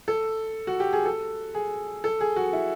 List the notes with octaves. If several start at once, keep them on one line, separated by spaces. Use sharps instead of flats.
A4
F#4
G4
G#4
A4
G#4
A4
G#4
F#4
E4